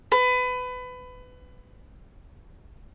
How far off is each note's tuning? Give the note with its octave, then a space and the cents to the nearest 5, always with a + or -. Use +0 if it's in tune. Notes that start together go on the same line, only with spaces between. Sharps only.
B4 +25